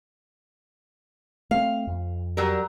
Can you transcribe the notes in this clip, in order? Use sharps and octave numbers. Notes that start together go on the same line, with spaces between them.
A3 C4 F5
F2
F#3 G3 A#4